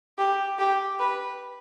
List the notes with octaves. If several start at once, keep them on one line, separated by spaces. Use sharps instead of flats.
G4
G4
B4